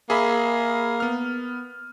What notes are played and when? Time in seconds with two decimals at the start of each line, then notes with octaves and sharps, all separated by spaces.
0.10 A#3 G#4 E5 B5
1.00 B3 F6